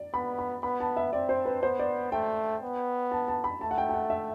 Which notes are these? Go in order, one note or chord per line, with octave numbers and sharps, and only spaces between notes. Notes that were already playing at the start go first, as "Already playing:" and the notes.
Already playing: D5
B3 B5
B5
B3 B5
A5
E5
C4 D5
C5
B4
B3 C5
D5
A3 G5
B3
A5
A5
B5
A3 A5
F#5
G5
G5
F#5
E5